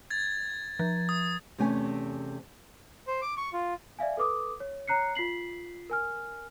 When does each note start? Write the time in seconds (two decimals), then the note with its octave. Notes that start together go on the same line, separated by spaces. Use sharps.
0.10 G#6 A6
0.79 F3
1.09 D#6
1.58 E2 C3 A3 C#4 G#5
3.07 C5
3.22 D6
3.37 C#6
3.53 F4
3.99 D5 E5 F5 G#5
4.17 A4 B4 D6 D#6
4.60 C#5
4.88 C#5 A#5 F#6 C7 C#7
5.15 F4 B6 C7 F#7
5.90 A#4 G#5 F6